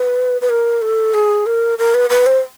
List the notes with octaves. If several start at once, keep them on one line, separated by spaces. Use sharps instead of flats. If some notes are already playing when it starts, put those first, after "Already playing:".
Already playing: B4
B4
A#4
A4
G#4
A#4
A#4
B4
B4
C5